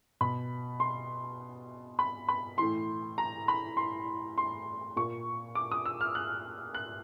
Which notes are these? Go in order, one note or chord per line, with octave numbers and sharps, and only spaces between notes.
B2 B5
C6
B5
B5
A2 E3 C6
A#5
B5
C6
C6
A#2 C#6
D6
D#6
E6
F6
F#6
F#6